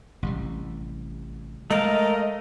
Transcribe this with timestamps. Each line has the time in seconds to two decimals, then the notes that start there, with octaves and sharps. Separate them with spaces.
0.23 A1 C3 G3
1.71 G#3 A3 A#4 D#5 F5